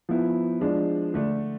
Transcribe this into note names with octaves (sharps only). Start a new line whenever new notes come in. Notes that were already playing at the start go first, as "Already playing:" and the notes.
F3 B3 E4
F3 G#3 D4
D3 A3 D4